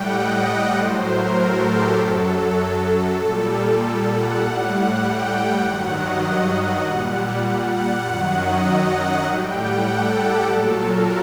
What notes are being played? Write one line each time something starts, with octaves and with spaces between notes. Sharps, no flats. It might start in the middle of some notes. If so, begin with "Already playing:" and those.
Already playing: A2 G3 F#5 G5
D#5
F#5
A2 F#3 C5
A#4
A4
G4
F#2 F#3 A4
A4
A#2 G3 A4
F#5
A2 G3
F#5
G5
G2 D#3 F#3 F#5
D#5
F#5
A#2 G3
F#5
F#2 D#3 F#3
D#5
F#5
A2 G3 G5
F#5
A4
G4
A#2 F#3 A4
A#4